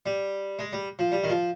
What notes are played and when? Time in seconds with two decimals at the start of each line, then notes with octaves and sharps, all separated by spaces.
0.06 G3
0.59 G#3
0.73 G3
0.99 F3
1.12 G3
1.24 D#3
1.30 F3